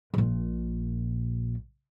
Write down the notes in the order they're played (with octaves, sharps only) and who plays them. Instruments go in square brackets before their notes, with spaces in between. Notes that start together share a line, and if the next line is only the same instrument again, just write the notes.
[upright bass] A#1 A#2